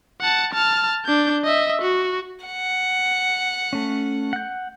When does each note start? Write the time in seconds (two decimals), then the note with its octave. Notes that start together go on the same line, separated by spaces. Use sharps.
0.21 F#5 A5
0.53 A5 F6
1.06 D4 G6
1.44 D#5 E5
1.82 F#4
2.46 F#5
3.73 A3 C#4
4.33 F#5 G6